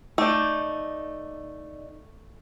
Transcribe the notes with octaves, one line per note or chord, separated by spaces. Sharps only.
A3 D#4 D5